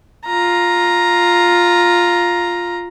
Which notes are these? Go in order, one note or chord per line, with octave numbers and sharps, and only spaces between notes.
F4 A#5